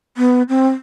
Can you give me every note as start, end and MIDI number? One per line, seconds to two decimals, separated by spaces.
0.17 0.42 59
0.49 0.69 60